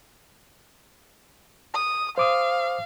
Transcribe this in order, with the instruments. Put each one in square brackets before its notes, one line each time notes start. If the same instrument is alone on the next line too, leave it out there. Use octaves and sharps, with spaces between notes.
[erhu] D#6
[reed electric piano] C5 D6 D#6 [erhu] F5